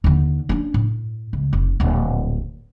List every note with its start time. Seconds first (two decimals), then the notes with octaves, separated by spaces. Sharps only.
0.04 D#2 D3
0.49 C#4 D4
0.74 A2
1.33 C#2
1.53 F1
1.80 D1 A#1